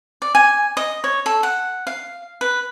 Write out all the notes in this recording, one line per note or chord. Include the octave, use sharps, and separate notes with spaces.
D5
G#5
D#5
C#5
A4
F#5
F5
B4